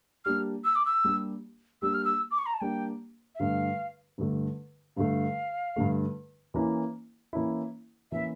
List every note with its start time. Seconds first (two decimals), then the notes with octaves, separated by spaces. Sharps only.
0.25 G3 A#3 D4 G4 F6
0.64 E6
0.75 D6
0.85 E6
1.04 G3 A#3 D4 G4
1.82 G3 A#3 D4 G4 E6
1.94 F6
2.05 E6
2.31 D6
2.38 C#6
2.46 A#5
2.54 A5
2.61 G3 A#3 D4 G4 G5
3.35 E5
3.39 G2 D3 A3 F5
4.18 G2 D3 A3
4.97 G2 D3 A3 F5
5.76 G2 D3 A3
6.54 E3 A#3 C#4 E4
7.33 E3 A#3 C#4 E4
8.12 E3 A#3 C#4 E4 E5